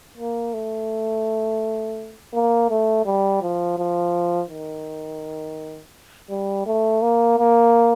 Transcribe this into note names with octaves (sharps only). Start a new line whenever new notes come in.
A#3
A3
A#3
A3
G3
F3
F3
D#3
G3
A3
A#3
A#3